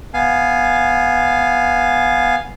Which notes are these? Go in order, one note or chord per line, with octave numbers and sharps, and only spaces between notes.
B3 F5 G#5